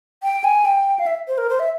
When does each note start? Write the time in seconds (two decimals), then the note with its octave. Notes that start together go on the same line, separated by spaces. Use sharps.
0.23 G5
0.44 G#5
0.65 G5
0.99 F5
1.06 E5
1.28 C5
1.38 A#4
1.49 C5
1.59 E5